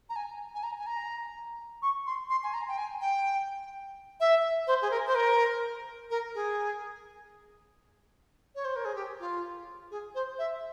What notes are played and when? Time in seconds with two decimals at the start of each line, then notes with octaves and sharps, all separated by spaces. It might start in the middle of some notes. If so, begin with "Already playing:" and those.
0.09 A#5
0.16 G#5
0.54 G#5
0.63 A#5
0.79 G#5
0.86 A#5
1.82 C#6
2.06 C6
2.29 C6
2.43 G#5
2.54 A#5
2.68 G5
2.78 G#5
3.01 G5
4.20 E5
4.67 C5
4.82 G#4
4.91 A#4
5.07 C5
5.15 A#4
6.10 A#4
6.35 G#4
8.55 C#5
8.65 C5
8.76 A#4
8.85 G#4
8.95 G4
9.20 F4
9.91 G#4
10.15 C5
10.39 E5